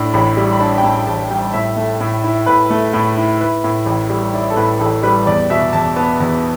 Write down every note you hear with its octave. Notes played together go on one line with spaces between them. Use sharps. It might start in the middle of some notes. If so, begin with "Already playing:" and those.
Already playing: A2 D4
A1 B5
G3
B5
D4 A5
G5
A2 A5
A1 A5
G3 G5
A2 E5
A3
A2
E4
A2 B4
A3
A2
E4
E4 B4
A2
A1
G3
E4 D5
A4
A2 B4
A1 A4
G3 B4
E2 D5
B2 E5
E2 A5
B3 A5
E2